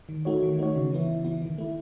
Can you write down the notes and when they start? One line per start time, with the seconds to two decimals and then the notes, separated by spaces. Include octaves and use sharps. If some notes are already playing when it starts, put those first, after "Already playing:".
0.09 D#3
0.25 A3 D#4 F#4 C#5
0.43 D#3
0.59 A3 D#4 F#4 C#5
0.76 C#3
0.92 E3 B3 E4
1.08 C#3
1.24 E3 B3 E4
1.42 D#3
1.58 A3 E4